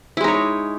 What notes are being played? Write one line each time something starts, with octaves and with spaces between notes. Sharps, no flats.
G#3 D#4 E4 C#5